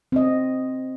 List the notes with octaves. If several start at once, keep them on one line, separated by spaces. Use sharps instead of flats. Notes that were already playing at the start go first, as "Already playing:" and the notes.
C4 D#5